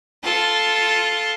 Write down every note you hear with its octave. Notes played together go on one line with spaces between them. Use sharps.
F4 A4